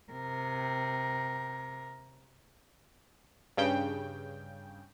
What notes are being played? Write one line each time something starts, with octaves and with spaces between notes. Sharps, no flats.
C3 A#4
G2 C#3 G5